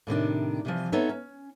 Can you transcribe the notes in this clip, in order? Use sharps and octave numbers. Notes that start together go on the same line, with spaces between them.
A2 C3 D#3 D4
C3 E3 F3
B3 C4 D#4 A4 C#5 E5
C#4